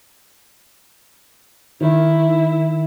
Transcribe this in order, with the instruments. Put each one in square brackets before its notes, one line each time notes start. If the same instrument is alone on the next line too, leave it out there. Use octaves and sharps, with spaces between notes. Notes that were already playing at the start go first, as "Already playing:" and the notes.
[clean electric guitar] D#3 [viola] E4